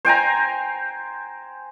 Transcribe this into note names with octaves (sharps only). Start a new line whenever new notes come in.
C5 G5 G#5 A#5